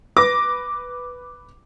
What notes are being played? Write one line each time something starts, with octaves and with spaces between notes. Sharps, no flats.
B4 D6 A#6